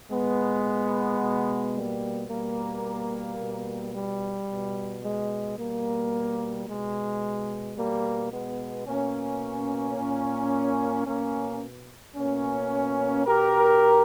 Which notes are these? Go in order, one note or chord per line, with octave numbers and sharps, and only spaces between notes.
A#2 G#3 B3
B2
G3 A#3
B2 G3 A#3
B2
G3
B2
G#3
B2 G3 A#3
B2 G#3
B2 G3 A#3
G#3 B3
B2 A#3 C#4
A#2
B2 A#3 C#4
B2 A#3 C#4
B2 G4 A#4